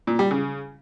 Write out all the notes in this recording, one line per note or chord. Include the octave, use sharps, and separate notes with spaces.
A#2
G3
C#3